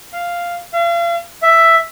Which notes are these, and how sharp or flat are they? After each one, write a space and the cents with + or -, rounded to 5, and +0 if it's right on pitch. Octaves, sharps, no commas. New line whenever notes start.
F5 -5
F5 -40
E5 +5